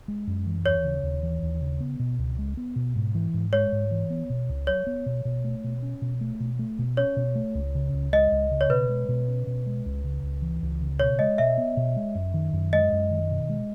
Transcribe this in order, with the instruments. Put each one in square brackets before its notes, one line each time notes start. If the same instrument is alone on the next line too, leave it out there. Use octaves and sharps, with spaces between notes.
[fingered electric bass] G#3
F#2
E3
[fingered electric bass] D#2 [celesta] C#5
[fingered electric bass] C#3
D#2
E3
D#2
C#3
B3
B2
C#2
G#3
B3
B2
G#2
E3
G#2
[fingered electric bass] G#3 [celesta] C#5
[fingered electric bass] G#2
E3
B3
B2
C#2
[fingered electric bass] F#3 [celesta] C#5
[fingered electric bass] B3
B2
B2
A3
B2
C#4
B2
A3
B2
A3
B2
[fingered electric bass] C#4 [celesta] C#5
[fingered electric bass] B2
A3
C#2
C#3
C#2
[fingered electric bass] G#3 [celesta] D#5
[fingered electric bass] C#2
C#3
[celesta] C#5
[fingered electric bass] B2 [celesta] B4
[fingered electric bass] G#3
B2
C#4
B2
G#3
C#2
C#3
C#2
E3
C#2
C#3
[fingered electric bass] B2 [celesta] C#5
[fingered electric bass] G#3 [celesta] D#5
[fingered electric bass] B2 [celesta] E5
[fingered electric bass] B3
B2
G#3
F#2
D#3
F#2
[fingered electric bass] G#3 [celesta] D#5
[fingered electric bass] F#2
D#3
B2
G#3